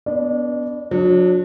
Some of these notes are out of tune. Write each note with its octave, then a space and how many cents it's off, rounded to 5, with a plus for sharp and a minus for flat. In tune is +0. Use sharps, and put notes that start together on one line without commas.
B3 +0 D4 -25 D5 +40
F#3 -35 D4 +0